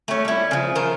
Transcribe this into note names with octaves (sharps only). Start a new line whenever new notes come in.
A3 C#4
G3 E4
C#3 F3
D#3 F3 C5